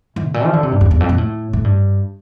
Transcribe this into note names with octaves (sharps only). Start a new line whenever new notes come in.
E3
A2
A#2
F3
D3
C3
G2
F2
E2
F2
A#2
A2
A2
G2